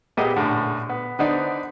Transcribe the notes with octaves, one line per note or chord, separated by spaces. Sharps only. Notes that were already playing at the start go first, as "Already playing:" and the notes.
A#2 G3 B3 G4 G#4 D#5
A#1 F#2 A2 D3
B3
D3 B3 D#4 C5 D5